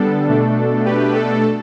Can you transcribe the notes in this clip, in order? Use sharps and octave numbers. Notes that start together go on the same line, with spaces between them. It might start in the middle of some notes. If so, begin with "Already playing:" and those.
Already playing: D3 G3 B3 D4 A4
B2 A3 D4
G4 B4
A4